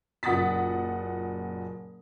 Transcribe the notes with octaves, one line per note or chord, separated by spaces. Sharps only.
F#1 A#2 F#5 D#6 A6 B6